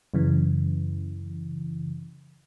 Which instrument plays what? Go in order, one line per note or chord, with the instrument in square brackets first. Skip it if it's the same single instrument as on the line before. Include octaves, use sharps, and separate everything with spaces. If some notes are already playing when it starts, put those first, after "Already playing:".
[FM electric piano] F#2 C#3 E3